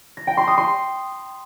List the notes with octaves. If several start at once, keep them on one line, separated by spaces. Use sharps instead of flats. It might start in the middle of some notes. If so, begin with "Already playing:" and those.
A#6
G5
C6
D#6
C6